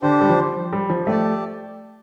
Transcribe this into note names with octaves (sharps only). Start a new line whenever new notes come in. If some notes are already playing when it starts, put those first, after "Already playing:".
D3 D4 G4 C5
G3
F3
G3
F3
A3 G4 D5 A5